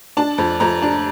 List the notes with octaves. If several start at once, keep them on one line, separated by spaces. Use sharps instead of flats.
D4 A5
F2
F2 A#5
D4